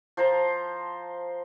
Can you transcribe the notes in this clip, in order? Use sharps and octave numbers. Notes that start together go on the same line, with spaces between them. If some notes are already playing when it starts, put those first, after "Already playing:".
F3 C5 A#5